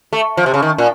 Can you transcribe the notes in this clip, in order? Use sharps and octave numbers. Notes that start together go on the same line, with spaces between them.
A3
F3
C3
C#3
D#3
A#2